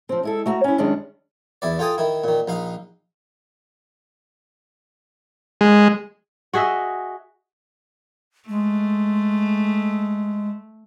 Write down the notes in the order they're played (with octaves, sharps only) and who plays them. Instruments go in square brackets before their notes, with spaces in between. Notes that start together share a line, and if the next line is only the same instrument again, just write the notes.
[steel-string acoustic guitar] F3 C4
G#3 E4 A4
A3 F#4 A#5
C#4 E4
F#2 D#3 G3 G#3 C#4 D4
[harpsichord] E2 E4 D5
F4 A4 G5 G#5 D#6
D#3 E4
A#2 D#3
A#1 D#4 F5
[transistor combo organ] G#3
[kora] F#4 G#4 D#5 E5
[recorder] G#3 [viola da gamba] A3